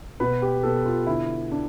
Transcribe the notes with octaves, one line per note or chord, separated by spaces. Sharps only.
B2 B4
G4
B2 A4
F4
D3 E4
D4